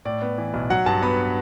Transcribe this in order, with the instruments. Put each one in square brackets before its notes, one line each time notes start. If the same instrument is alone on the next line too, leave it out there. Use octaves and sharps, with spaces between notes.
[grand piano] A2 D5
B3
E3
B1
F#3 F#5
G2 A5
B3 B5